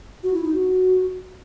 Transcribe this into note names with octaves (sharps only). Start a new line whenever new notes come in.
F#4
E4
D#4
F#4